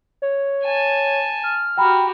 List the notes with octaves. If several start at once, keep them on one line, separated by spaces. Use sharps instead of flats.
C#5
G#5 A5
F6
F#4 G4 G5 A#5 B5